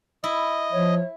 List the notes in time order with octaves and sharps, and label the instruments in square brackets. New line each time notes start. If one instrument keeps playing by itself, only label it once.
[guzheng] E4 [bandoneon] D#5
[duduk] F3 [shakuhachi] C#5